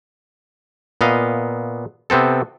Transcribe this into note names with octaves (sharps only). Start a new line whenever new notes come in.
A#2 B3 D#5 F5
C3 B3 C4 A4